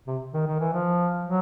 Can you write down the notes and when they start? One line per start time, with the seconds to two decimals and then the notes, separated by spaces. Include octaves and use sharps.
0.07 C3
0.34 D#3
0.46 D#3
0.60 E3
0.73 F3
1.26 F#3